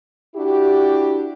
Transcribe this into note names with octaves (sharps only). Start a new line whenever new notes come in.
D4 E4 F#4 G4